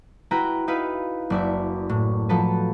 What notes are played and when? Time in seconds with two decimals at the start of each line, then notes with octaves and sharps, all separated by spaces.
0.31 E4 F#4 B4 G5 A#5
0.68 D#4 E4 B4 F5
1.30 F#1 D5 E5
1.89 A2
2.29 F3 F#3 A4 B4